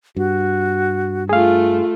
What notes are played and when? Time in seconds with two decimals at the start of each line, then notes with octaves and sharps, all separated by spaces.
0.16 G2 F#4
1.29 A3 F4 G#4 F5